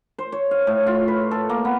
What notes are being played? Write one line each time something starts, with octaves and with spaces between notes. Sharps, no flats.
C5
C#5
F5
A2
F4
B4
A4
A#3
B3